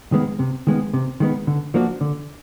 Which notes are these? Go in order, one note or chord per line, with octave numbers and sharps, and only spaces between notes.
D#3 G#3 B3
C3
D#3 G#3 B3
C3
D#3 G#3 B3
D3
F3 A#3 D4 F#4
D3